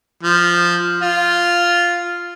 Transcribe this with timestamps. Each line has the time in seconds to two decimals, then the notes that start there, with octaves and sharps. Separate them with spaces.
0.23 F3
1.02 F4